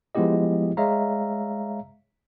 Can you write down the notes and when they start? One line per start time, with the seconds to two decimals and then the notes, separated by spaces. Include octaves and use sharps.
0.15 F3 G#3 B3 E4 G4 D#5
0.77 G#3 C#5 E5 F5 A#5